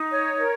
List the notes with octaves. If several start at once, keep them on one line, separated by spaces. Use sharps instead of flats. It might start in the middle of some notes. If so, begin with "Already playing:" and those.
Already playing: D#4
C#5
A#4